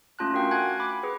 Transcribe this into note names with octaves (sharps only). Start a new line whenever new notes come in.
A3 C#4 F4 A5 F#6
D4 F#4 A#4 F5 G5
F#5 G#5 F#6 G#6
B5 D6
G#4 B4